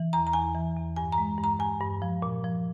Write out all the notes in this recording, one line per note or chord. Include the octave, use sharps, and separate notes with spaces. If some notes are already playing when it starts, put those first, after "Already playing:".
Already playing: E3
E2 A#5
A#5
E2 G#5
E3
E2
G2 G#5
A#5
G#3
G2
A#5
G2 G#5
G2
F3
A#2
F3